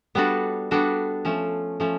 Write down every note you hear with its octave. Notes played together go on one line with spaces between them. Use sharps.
G3 B3 D4 F#4 A4
G3 B3 D4 F#4 A4
F3 A3 C#4
F3 A3 C#4